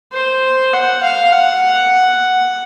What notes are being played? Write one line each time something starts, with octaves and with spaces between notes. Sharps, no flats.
C5
F#5
F5
F#5